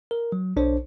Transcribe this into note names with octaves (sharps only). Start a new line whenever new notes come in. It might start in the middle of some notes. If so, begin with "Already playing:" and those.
A#4
F#3
B1 D4 C5 C#5